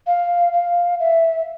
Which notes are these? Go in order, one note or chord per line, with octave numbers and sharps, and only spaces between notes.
F5
F5
E5